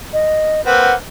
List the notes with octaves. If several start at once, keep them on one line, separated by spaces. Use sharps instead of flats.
D#5
A#3 C4 B4 F#5